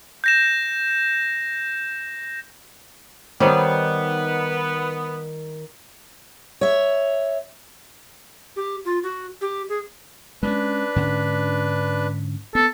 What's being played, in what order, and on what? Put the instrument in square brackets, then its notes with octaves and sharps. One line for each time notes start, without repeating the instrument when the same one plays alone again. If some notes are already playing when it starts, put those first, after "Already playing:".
[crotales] G6 A#6 E7
[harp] D#3 [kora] G3 [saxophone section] B3 [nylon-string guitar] D#4 C5 C#5
[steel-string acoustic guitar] C#5 E5
[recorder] G4
F4
F#4
G4
G#4
[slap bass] G#3 A#3 C#4 [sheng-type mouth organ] D4 B4
[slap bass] G#2 D3 C#4
[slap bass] B3 [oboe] A4